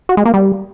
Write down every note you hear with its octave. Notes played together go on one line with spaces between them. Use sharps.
F#4
G#3
A#3
G3